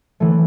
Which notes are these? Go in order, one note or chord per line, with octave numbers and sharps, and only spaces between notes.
E3 A3